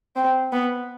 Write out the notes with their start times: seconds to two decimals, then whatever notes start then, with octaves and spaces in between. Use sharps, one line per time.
0.16 C4
0.52 B3